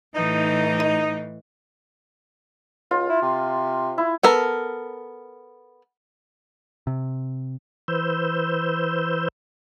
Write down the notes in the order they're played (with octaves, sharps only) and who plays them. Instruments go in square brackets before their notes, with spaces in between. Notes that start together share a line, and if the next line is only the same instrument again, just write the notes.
[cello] A2 E3 [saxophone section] D#4
[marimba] D#5
[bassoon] C#2 [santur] F4
[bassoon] E4
C3
[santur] E4
[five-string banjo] B3 A4 A#4
[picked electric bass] C3
[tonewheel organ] E3 B4 C5 E6 G6